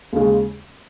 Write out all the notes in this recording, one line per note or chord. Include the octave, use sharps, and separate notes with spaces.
D#2 C#3 G#3